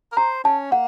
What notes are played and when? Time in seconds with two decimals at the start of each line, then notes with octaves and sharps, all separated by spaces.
0.12 A#4
0.17 C5 A#5
0.44 C#4 A5
0.71 A#3 F#5